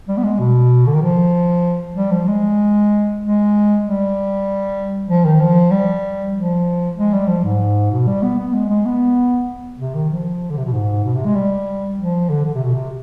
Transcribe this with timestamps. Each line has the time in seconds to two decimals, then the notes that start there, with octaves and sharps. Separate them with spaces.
0.08 G3
0.17 B3
0.24 G#3
0.39 B2
0.87 D3
0.94 D#3
1.02 F3
1.96 G3
2.11 F3
2.28 G#3
3.21 G#3
3.84 G3
5.09 F3
5.25 D#3
5.40 F3
5.71 G3
6.34 F3
6.97 G#3
7.13 G3
7.28 F3
7.44 G#2
7.91 B2
8.07 G3
8.22 B3
8.38 B3
8.53 G#3
8.69 G#3
8.85 B3
9.79 C3
9.94 D#3
10.11 F3
10.51 D3
10.57 C3
10.65 B2
10.73 G#2
11.04 B2
11.14 C3
11.25 G#3
11.35 G3
11.99 F3
12.30 D3
12.45 D3
12.55 C3
12.64 B2
12.73 C3